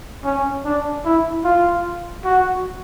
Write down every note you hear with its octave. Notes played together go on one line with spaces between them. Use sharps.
C#4
D4
E4
F4
F#4